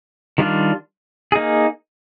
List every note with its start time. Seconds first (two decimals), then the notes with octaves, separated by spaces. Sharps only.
0.38 D#3 G3 D4 F4
1.32 A#3 D#4 G#4